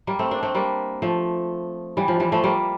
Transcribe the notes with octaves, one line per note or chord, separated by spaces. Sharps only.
G3 A#3
A3 C4
A#3 D4
A3 C4
G3 A#3
F3 A3
E3 G3
F3
E3 G3
F3 A3
G3 A#3